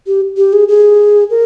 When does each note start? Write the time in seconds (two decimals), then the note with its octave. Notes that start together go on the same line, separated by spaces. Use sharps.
0.07 G4
0.37 G4
0.53 G#4
0.68 G#4
1.30 A#4